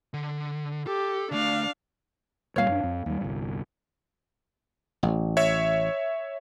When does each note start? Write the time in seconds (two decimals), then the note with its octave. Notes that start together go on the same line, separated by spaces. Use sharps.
0.14 D3
0.87 G4 A4
1.31 D2 A3 D4 F5
2.56 F#1 A#2 G3 C#5 F5
2.69 F#2 C4 D4
2.84 F2
3.06 D#2 G3
3.21 G1 C2
5.03 A1
5.37 C#5 E5